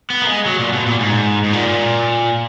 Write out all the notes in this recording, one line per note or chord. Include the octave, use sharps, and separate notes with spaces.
B3
A#3
G#3
F#3
A#2
B2
A#2
G#2
G#2
A#2